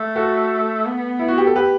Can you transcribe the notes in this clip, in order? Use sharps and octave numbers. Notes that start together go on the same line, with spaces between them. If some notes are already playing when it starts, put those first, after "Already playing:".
Already playing: A3
F#4 A4
B3
E4
F#4
G4
A4
G4 B4